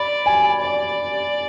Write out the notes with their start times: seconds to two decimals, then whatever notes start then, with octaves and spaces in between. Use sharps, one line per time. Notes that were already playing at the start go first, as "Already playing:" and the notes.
Already playing: D5 B5
0.26 G#5
0.60 D5